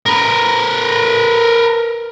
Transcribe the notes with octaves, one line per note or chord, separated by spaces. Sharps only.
A#4 B4